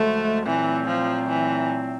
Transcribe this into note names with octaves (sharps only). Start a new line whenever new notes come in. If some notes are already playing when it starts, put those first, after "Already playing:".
Already playing: D2 D3 F3 G#3 A3
A#2 E3 F#3 A3 C4
F3
E3